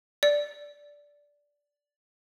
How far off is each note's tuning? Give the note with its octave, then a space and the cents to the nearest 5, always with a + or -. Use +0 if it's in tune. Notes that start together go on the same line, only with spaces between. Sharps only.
D5 -10